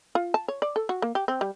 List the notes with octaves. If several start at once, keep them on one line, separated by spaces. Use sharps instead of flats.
F4
A5
C#5
D5
A4
F#4
A#3
G4
C4
G3